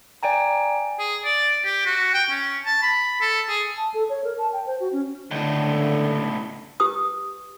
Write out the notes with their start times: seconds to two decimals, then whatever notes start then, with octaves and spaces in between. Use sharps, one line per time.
0.23 D5 G5 G#5 A#5
0.99 G#4
1.24 D5
1.65 G4
1.86 F#4
2.14 G5
2.30 C#4
2.66 A5
2.83 B5
3.21 A4
3.49 G#4
3.77 A5
3.94 A4
4.09 C#5
4.24 A#4
4.38 A5
4.53 G5
4.67 C5
4.80 F#4
4.93 C#4
5.31 C#2 A2 D3
6.80 G4 B4 D#6